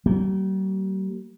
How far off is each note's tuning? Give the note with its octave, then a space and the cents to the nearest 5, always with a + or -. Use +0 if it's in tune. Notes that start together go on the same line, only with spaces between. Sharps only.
G3 -45 A#3 -30